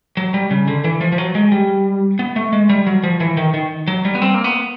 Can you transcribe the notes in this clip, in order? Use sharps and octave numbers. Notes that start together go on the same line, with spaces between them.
F#3
G3
C#3
D3
E3
F3
F3
F#3
G#3
G3
B3
A3
G#3
G3
F#3
F3
E3
D#3
D#3
F#3
G3
B3
C4
A#3
B3